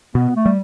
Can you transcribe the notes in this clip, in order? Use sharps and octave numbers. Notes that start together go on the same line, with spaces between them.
B2 B3
A3
G3